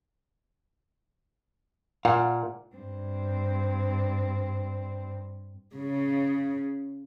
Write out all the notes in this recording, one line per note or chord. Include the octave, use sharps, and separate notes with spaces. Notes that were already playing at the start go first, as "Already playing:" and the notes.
A#2 F5 F#5
G2 C4
C#3